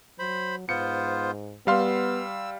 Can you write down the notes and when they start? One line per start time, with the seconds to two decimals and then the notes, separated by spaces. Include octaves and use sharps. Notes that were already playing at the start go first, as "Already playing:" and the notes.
0.19 F#3 C5 B5
0.69 G#2 B3 F4 C5 C#7
1.67 G3 B3 F5 C6 E6